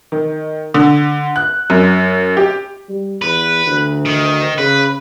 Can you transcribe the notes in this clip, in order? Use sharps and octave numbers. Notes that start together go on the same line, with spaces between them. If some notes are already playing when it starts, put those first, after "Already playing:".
D#3
D3
F#6
F#2
G4
G3
E2 B4
D2
D#3
C#3 B4